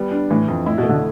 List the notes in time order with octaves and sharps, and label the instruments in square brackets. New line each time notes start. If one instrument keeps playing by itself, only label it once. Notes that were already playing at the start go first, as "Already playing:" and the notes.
Already playing: [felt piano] G3 B3
D4
[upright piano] A2 [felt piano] E3
[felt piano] F2
[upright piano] A2 [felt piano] E4
[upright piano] B2
[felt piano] A3
[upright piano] B2 D3